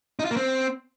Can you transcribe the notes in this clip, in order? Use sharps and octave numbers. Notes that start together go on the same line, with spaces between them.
D#4
F4
A#3
C4